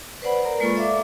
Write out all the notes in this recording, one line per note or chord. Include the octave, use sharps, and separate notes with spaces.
B4 C5 D5 F#5 B5
A#4 D5 A#5
G#3 A#3 F4 A4 D5 C#6
A4 D5 E5 F5 D6